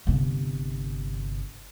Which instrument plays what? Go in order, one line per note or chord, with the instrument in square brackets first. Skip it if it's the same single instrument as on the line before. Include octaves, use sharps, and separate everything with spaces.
[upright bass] G1 C3